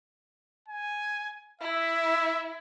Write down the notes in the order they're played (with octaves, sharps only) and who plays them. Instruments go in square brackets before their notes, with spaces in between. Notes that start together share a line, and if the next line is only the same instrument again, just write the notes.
[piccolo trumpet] G#5
[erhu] E4 [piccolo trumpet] E5